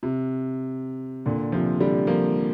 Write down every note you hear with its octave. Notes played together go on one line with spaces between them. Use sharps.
C3
A#2 D3
C3 F3
D3 G3
F3 A#3